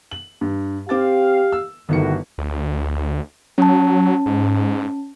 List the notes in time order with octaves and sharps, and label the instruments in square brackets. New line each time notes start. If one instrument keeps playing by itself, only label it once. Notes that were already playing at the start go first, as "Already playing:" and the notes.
[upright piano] F#7
G2
[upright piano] C4 D6 A6 [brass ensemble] G4 F5
[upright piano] E6
[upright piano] G1 D#3 C#7 [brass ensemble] D#2 A2 F#4
[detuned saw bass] D2
[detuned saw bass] F#3 [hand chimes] C#4 A5
[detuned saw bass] G#2